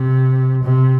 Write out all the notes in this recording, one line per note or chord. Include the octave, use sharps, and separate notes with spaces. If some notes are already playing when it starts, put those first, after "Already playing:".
Already playing: C3
C3